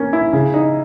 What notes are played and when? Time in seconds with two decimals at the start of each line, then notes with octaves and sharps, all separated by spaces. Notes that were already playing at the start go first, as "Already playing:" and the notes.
Already playing: A#3 C#4
0.13 E4
0.33 C#3
0.54 D#4